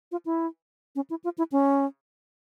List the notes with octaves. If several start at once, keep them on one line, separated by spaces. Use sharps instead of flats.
F4
E4
C#4
E4
F4
E4
C#4